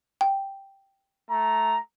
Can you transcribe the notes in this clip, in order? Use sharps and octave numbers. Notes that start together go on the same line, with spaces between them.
G5
A3 A#5